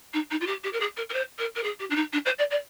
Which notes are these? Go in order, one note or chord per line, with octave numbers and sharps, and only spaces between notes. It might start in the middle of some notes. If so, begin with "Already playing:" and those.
D#4
D#4
F4
G4
G4
A#4
G#4
A#4
A#4
C5
A#4
A#4
G#4
G4
D4
D#4
D4
C5
D5
D5